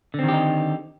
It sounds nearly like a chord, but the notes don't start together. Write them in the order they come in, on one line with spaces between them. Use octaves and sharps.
D3 C4 D#3 G4 D#4